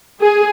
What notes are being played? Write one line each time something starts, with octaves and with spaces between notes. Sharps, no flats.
G#4